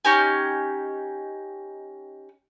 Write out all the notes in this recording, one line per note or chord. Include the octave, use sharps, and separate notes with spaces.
C#4 D#4 G4 G#5